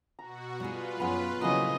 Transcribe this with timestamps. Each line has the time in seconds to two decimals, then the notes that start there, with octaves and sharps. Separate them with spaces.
0.19 B2 F#4 A#5
0.60 G3 B3 F4 G#4 B4
1.00 F#2 B3 G#4 C#5 G#5
1.41 C#3 F#3 A#3 C4 C#4 E4 F#4 D#5